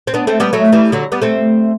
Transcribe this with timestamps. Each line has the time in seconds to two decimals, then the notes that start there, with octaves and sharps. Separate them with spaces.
0.07 C4
0.14 B3 D4
0.27 A3 C4
0.40 G3 B3
0.53 F#3 A3
0.72 E3 G3
0.92 D3 F#3
1.12 G3 B3
1.22 A3 C4